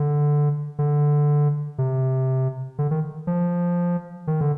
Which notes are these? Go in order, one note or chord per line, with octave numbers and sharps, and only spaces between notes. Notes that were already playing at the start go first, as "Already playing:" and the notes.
Already playing: D3
D3
C3
D3
D#3
F3
D#3
D3